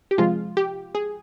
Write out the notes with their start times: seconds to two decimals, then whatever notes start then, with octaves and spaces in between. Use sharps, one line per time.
0.11 G4
0.18 C3 F3 G#3 F4
0.57 G4
0.95 G#4